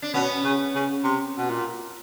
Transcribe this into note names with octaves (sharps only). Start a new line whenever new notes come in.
D4
B2 B3 C#4
C#3
C#3
C3
B2
A#2